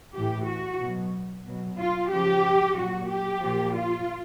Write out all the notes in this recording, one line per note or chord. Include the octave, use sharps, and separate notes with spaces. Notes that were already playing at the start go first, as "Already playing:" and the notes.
A2 E3 G4
F#4
B2 F#3
B2 F#3
F4
C#3 F3 G4
A#2 F#3 F#4
G4
A#2 F3
F4